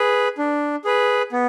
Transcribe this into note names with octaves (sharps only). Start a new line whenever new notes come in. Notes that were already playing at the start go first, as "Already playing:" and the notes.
Already playing: G#4 B4
D4
G#4 B4
B3